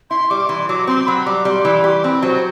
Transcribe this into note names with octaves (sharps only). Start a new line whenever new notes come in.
E4 C6
G3 D6
E3 C6
F#3 D6
C4 C6
F#3 B5
G3 D6
G3 D6
C6
E3 B5
G4 D6
C6
C4 B5 C6
F#3 C5